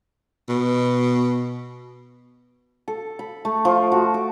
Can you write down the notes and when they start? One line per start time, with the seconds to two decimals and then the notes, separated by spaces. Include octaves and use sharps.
0.48 B2
2.88 A4
3.19 B5
3.45 A3
3.65 F3
3.92 F#4
4.14 D6